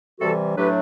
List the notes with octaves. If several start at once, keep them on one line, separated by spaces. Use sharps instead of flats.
C3 E3 G3 F#4 A4
A2 F#3 A3 D4 G4 B4